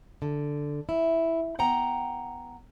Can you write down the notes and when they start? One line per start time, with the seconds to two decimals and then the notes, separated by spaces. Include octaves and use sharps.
0.22 D3
0.89 E4
1.59 B3 F#5 G5 A#5